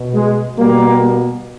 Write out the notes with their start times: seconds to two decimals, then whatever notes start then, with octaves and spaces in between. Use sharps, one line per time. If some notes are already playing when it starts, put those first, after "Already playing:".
Already playing: B2
0.14 G#3
0.57 B2 G3 A#3